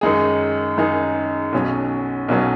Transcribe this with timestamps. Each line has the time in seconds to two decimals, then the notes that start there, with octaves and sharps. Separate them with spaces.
0.01 F#2 D#3 G#3 D#4 G#4
0.78 F#2 D#3 G#3 D#4 G#4
1.53 B1 B2 F#3 C#4
2.29 B1 B2 F#3 C#4